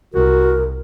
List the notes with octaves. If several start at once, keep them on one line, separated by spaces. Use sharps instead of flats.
C2 F#4 A#4